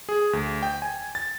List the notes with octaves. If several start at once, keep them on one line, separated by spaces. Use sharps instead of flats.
G#4
D2
G5
G#5
A6